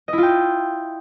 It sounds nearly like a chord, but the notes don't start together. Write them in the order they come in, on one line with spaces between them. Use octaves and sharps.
D#5 E4 F4 G5